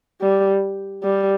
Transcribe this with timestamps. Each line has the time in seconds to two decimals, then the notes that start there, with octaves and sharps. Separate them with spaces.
0.21 G3
1.03 G3